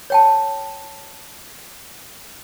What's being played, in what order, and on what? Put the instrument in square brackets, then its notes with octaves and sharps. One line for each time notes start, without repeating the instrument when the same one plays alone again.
[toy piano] C#5 G5 A5